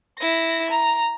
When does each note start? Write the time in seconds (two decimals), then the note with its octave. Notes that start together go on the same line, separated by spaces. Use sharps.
0.19 E4 A#6
0.70 A#5